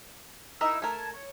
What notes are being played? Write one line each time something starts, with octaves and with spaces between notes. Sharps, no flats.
D#4 E4 A#4 D#5 E5 E6
A3 A#4 A5 G#6
C#5